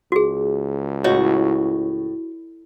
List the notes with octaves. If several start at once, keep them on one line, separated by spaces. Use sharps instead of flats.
C#2 F#4 G#4
A2 F#4 C#5 D#5